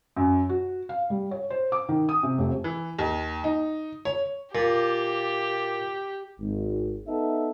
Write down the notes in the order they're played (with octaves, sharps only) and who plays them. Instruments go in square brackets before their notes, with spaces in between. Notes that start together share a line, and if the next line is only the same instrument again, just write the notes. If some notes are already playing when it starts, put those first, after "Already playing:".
[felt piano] F#2
F#4
F5
G3
C#5
C5
D6
D#3
D#6
C3
F1
[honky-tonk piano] E3
D#2
D#4
C#5
[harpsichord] A#2 [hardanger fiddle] G4
[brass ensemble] G#1
B3 D#4 A4 E5